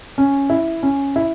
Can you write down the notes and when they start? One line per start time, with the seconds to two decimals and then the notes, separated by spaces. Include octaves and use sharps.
0.18 C#4
0.50 E4
0.83 C#4
1.16 E4